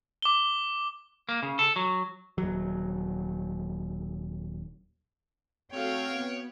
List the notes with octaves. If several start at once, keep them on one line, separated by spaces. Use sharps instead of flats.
D6 G7
A#3
C#3
A4
F#3
D#1 F#3
A3 C4 F#4 C#5 F5 G5
B3